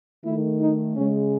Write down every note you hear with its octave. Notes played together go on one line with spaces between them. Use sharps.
D#3 A3 E4
D#4
C#3 G#3 C#4